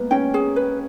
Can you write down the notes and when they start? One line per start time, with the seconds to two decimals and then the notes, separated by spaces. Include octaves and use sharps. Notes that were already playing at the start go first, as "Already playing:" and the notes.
Already playing: G#3 A#3 B3
0.11 C#4 G5
0.34 G#4
0.56 B4